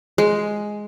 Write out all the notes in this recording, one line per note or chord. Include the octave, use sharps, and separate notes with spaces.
G#3